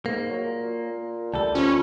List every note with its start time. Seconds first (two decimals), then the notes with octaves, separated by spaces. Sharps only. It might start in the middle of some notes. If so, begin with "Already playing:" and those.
0.06 G#2 A#3
0.29 F#3
0.44 A#2
1.34 D2 G3 A4 A5
1.55 F3 C#4 F4 B5